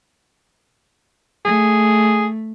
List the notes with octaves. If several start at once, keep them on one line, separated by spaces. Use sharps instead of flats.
A3 G#4